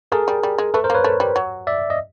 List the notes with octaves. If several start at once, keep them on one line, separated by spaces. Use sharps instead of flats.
A3 G#4 A#4
G3
G3
G#3
A3 A4 B4
A#4 C5
A#3 B4 C#5
A3
G3
F#3
D5 E5
D#5